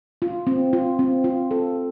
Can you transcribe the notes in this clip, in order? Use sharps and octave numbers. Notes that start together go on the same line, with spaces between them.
F4
C4
F4
C4
F4
A4